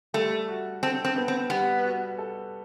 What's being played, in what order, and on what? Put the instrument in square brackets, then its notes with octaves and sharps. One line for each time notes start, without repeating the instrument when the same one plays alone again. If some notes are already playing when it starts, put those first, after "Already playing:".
[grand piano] G3 [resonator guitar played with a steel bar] A3
[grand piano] F#4
[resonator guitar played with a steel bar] C4 [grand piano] A4
[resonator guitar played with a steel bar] C4
[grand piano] B3
[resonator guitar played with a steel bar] C4
[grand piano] G3 [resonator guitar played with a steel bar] B3
[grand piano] F#4
A4